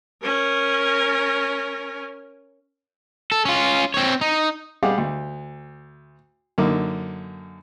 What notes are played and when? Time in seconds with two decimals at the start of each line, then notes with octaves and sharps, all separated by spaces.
0.23 C#4 A#4
3.32 A4
3.45 C#4 F4
3.94 C4 C#5
4.21 D#4
4.83 G3 G4 G#4 F5 F#5
4.98 D2
6.58 F#2 D3 A#3 D#4